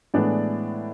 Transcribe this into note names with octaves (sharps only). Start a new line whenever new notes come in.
A2 E3 G#3 B3 D4 D5